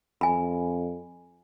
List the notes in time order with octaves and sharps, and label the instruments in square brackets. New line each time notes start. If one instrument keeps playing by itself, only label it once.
[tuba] F2 [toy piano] G#5 B5